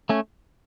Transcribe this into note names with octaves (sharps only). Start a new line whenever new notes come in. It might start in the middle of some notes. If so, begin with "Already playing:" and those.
A3 C#4